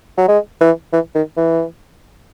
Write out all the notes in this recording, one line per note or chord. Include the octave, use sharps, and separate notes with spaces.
F#3
G#3
E3
E3
D#3
E3